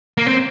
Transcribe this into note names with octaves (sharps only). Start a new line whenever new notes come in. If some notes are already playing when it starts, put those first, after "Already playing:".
A#3
C4